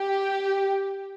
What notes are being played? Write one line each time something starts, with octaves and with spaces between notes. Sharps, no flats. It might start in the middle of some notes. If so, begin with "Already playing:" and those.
Already playing: G4